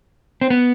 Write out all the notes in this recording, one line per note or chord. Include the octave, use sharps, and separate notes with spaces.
C4
B3